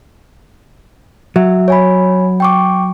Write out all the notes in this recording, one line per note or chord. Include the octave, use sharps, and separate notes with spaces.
F#3 E5
C#5 G#5 B5
G5 C#6 D6